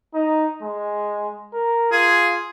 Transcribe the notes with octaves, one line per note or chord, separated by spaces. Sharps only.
D#4
G#3
A#4
F4 G#4